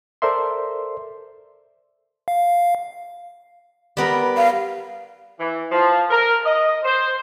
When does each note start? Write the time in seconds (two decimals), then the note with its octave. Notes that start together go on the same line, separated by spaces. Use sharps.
0.22 A4 A#4 C5 D5 E5 C6
2.28 F5
3.97 G3 B3 A#4
4.37 F5
5.40 E3
5.72 F3
6.11 A#4
6.45 D#5
6.84 C5